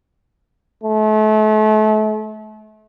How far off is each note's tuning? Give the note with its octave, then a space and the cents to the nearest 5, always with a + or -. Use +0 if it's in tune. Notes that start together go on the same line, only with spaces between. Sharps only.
A3 -35